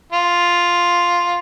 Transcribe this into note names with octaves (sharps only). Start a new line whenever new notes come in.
F4